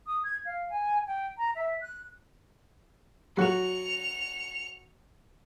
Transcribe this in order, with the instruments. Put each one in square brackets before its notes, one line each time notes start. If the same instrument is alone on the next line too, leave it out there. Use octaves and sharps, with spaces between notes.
[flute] D#6
G#6
F5
G#5
G5
A#5
E5
F#6
[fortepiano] F#3 F#4 [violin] C#7 F7